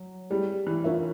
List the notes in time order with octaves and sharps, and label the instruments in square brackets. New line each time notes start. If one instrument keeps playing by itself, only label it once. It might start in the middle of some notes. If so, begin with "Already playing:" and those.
Already playing: [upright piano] F#3
[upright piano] G3 [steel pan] C4 E4 G#4
[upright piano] E3
[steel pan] D4 F4 A#4 C#5 E5